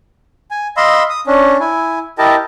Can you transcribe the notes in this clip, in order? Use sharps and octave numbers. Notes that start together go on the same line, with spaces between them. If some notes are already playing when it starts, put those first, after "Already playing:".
G#5
D#5 F5 B5 C6 E6
D#6
C#4 D4
E4 G#5
E4 G4 A#4 D#5 G5 A5